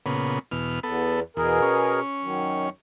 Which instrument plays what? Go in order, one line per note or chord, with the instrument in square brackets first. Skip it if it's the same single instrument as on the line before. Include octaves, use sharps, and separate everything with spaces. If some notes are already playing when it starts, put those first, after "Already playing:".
[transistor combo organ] A#2 C#3 B3
E2 B2 F6
[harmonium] E2 [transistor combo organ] B3 A4
[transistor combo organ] E2 [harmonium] B2 G#4 A#4
[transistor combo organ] C#4
[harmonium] F#2 D#3 F#3